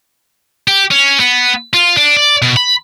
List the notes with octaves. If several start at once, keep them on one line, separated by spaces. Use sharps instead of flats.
G4
C#4
B3
F4
D4
D5
B2
B5